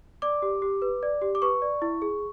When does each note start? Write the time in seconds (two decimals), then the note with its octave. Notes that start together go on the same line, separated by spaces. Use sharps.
0.22 D5 D6
0.42 G4
0.62 G4
0.82 B4
1.03 D5
1.22 G4
1.35 D6
1.42 B4 C#6
1.62 D5
1.82 E4
2.02 G#4